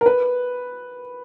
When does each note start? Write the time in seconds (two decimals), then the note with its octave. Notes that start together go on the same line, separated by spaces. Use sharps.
0.01 A#4
0.06 B4